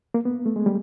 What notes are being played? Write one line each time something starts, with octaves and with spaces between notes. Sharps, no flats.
A#3
B3
A3
G#3
G3